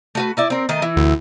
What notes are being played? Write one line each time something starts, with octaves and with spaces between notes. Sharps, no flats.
A3 F#4 B4
D#4 E4 D5
C4 A#4
D#3 A3 D#5
E3 E4
D2